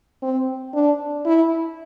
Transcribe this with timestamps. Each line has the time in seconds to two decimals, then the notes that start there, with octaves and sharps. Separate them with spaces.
0.22 C4
0.74 D4
1.26 E4